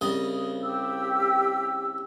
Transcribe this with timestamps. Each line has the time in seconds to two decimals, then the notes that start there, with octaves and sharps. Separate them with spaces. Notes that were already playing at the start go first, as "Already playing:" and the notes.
0.01 C2 C#3 D#5
0.61 G4 E6